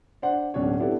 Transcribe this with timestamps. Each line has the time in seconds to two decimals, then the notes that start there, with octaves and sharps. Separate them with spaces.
0.22 D4 C5 F#5
0.54 D1 B2 C#4 D4 C#5
0.79 B3 D4 E4 G4 A4